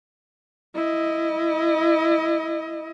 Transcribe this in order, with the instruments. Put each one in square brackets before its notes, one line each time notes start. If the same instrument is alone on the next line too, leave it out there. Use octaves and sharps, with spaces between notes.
[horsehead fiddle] E4 D#5